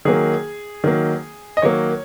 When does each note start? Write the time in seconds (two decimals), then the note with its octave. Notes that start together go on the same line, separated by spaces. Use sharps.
0.05 D#3 F#3 A#3 G#4
0.84 D#3 F#3 A#3
1.57 D#5
1.62 D#3 F#3 A#3 C#5